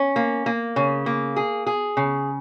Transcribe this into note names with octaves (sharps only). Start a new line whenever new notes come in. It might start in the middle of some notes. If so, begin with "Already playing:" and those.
Already playing: C#4
A#3
A#3
C#3
A#3
G#4
G#4
C#3